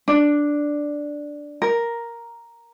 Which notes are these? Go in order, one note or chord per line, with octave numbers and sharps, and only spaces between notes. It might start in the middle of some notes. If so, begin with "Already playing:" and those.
D4
A#4